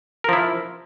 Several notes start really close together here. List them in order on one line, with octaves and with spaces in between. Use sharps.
A#4 F3 E4